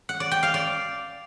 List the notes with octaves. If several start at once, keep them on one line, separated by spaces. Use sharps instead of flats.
F#5
D5
G5
F5
D5